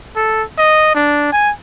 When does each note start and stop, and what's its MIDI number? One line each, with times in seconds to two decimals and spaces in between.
0.16 0.42 69
0.58 0.90 75
0.95 1.28 62
1.32 1.51 80